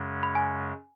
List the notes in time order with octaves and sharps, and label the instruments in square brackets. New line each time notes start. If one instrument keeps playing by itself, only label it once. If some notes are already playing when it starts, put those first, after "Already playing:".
Already playing: [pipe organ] F#2 C#3 G#3 C#4
[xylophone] B5
G#5